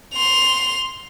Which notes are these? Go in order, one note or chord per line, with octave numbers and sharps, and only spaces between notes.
C6 F7